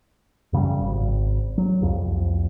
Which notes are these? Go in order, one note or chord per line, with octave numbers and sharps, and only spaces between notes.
F#2 C#3 F3 G3
G#1
F#3
C2 F2